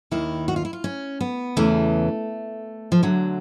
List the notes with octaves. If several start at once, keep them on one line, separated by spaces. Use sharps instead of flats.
D#2 D#3 E4
F#4
F4
E4
F4
C#4
B3
E2 C#3 E3 A3
F3
D2 D3 F#3